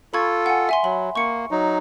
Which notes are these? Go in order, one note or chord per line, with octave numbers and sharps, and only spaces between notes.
F4 A4 B5 C#6 G#6
F#5 G#5
E5 G#5 C6
F#3 B5
A#3 C#6 C#7
F#3 D#4